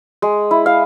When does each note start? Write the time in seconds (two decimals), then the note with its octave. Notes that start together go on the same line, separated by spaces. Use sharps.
0.22 G#3
0.51 E4
0.66 F5